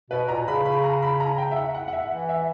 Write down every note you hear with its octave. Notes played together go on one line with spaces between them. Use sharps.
B2 B4
A#2 A#5
C#3 B5
B5
A#5
B5
A#5
G5
E5
F#5
F#5
F#5
E5
E3
E5